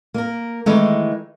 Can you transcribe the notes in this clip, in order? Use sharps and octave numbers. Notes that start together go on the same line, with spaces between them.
A#3 A#4
D#3 E3 G#3 A3